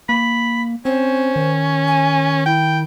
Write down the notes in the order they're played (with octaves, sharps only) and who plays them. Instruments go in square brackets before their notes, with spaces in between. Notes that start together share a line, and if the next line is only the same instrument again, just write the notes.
[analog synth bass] A#3 [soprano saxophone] B5
[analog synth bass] C4 [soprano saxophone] C#4 [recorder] C5
[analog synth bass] D#3
[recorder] G#5
[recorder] E4 [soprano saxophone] G5